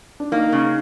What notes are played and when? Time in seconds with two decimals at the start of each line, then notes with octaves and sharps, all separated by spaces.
0.20 D4
0.32 A#3 D#4
0.52 C#3